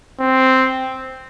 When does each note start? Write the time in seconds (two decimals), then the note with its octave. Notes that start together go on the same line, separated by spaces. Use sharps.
0.20 C4